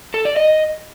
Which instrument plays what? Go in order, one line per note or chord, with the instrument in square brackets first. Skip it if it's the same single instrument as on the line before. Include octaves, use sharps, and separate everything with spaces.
[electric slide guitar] A4
D5
D#5